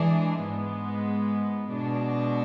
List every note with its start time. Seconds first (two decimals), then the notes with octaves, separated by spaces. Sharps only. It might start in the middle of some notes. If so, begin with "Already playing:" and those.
Already playing: E3 G#3 D4 G#4
0.40 G#2 G#3 B3
1.72 B2 G#3 D4